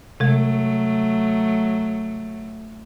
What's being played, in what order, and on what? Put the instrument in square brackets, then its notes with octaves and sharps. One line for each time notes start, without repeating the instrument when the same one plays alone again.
[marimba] C3 G#3 [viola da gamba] F#3 A3